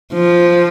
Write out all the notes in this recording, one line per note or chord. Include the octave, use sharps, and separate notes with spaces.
F3